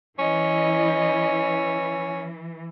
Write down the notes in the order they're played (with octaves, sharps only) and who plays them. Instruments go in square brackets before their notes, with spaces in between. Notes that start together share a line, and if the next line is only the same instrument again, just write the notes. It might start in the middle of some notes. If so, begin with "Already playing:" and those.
[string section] E3 [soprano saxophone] C#4 [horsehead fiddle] E4 D#5